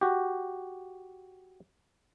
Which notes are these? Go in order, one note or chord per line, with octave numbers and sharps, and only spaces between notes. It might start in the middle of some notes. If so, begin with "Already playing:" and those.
F#4 G4